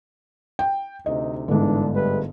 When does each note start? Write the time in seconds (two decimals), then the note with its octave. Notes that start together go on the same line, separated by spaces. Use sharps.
0.59 G5
1.06 D2 C3 D#4 D#5
1.48 G1 G#2 E3 D4
1.94 G3 A3 B4